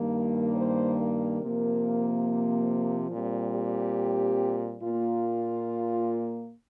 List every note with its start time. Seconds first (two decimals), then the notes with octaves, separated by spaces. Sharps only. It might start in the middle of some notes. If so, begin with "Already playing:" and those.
Already playing: G2 D#3 G3 A#3
0.12 A#4
0.55 C5
0.98 A#4
1.41 C3 F3 A#3
3.11 A#2 G3 C4
3.54 G4
4.82 A#2 A#3 F4